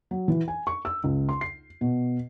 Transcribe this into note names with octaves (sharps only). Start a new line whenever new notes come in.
F#3
E3
G#5
C#6
E6
C#2
C6
C7
B2